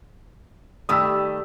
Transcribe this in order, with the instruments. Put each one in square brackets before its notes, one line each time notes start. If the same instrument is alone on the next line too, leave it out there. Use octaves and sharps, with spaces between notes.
[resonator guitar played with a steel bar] D#3 A3 G4 [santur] G3 [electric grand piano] D#6 E6